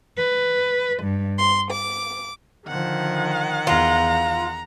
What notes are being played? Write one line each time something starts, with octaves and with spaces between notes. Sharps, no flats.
B4
G2
C6
D6
D3 D#3 F3 F#5
E2 F4 A#5